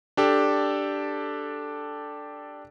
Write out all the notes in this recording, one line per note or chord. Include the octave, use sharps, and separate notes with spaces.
D4 G4 A4